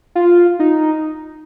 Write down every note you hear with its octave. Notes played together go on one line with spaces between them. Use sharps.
F4
D#4